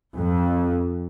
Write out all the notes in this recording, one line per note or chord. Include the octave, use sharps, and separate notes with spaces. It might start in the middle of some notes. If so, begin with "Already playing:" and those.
F2